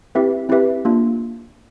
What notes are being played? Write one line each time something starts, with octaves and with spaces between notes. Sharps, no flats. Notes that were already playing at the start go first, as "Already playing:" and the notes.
C4 E4 G4 B4 E5
C4 E4 G4 B4 E5
A#3 D4 F4